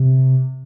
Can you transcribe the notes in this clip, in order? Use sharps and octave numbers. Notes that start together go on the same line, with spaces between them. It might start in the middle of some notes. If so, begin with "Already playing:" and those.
Already playing: C3